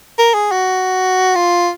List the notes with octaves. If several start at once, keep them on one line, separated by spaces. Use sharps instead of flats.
A#4
G#4
F#4
F4